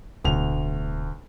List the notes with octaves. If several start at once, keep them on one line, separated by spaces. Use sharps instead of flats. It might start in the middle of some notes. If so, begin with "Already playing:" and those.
D1 D2 B2 F7